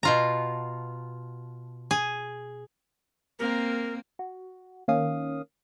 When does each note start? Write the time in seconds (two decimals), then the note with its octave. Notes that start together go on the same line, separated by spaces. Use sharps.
0.03 B2 F4 A#5
1.91 G#4
3.39 A#3 C4 A#4
4.19 F#4
4.88 D#3 A#3 C#4 F5 D#6